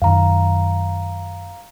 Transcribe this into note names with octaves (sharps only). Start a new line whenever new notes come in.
F#2 D#3 F5 A#5